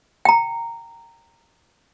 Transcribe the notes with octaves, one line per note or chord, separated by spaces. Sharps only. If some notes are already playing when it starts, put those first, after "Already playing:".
G5 A#5